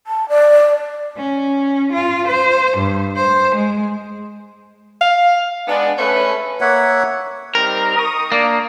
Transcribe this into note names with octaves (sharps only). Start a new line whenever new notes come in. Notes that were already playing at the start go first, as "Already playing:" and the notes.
A5
D5
C#4
F4
C5
G2
C5
G#3
F5
G#3 B3 D4
A3 C#4 B4
A#3 C#5 E5 F#5
G3 C4 D#4 A#4
C#6 D#6
A#3 D4 D5